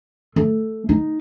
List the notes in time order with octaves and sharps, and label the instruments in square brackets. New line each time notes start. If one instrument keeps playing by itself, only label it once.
[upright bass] A3
D#4